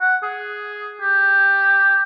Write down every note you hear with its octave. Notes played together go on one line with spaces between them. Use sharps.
F#5
G#4
G4